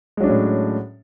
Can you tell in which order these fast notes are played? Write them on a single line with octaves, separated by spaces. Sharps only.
G#3 F#3 D4 C#4 A2